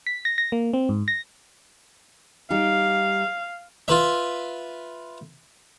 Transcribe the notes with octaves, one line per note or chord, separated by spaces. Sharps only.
B6
A#6
A#6
A#3
C4
G#2
A#6
G3 D#4 G4 F5
F4 B4 E5